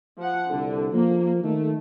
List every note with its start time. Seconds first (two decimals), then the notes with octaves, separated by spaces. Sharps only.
0.18 F3 F#5
0.50 C2 D3
0.92 F3 A#3
1.43 D#3 A3